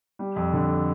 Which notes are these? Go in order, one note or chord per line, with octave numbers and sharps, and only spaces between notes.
G3
F2
D3